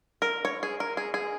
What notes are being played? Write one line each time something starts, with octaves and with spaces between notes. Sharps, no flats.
A#4
C#5
G#4
A#4
G#4
G#4